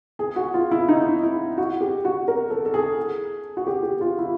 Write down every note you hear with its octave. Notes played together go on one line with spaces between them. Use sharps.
G#4
F#4
F4
E4
D#4
E4
F#4
G4
F#4
A#4
A4
A4
G#4
F#4
G4
G4
F4
E4